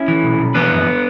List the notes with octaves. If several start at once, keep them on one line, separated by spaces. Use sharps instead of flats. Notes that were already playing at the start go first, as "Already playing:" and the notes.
Already playing: C#4 E4
E3
B1
B1
E3 B3 D4
F#2